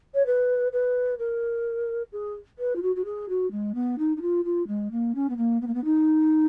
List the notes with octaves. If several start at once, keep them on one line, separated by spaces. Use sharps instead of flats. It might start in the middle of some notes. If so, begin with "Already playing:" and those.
C#5
B4
B4
A#4
G#4
B4
F4
F#4
F#4
G#4
F#4
G#3
B3
D#4
D#4
F4
F4
G#3
A#3
C#4
B3
A#3
B3
A#3
B3
D#4